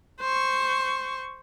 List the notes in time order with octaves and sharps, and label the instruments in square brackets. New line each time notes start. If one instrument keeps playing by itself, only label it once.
[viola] C5 C#6